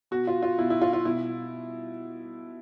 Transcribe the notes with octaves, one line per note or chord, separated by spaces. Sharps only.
B2 F#4
F4
F4
B2 E4
E4
F4
F4
B2 E4